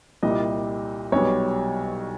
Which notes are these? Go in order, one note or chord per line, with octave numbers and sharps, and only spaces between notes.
C2 A#2 G3 D#5
B1 B2 G3 C#5